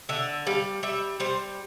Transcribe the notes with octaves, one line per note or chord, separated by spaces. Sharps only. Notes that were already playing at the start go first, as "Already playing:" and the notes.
D3 E5
G3 F5
G3 E5
G3 C5